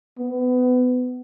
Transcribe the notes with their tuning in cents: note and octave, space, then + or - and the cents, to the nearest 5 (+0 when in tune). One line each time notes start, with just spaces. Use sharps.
B3 +25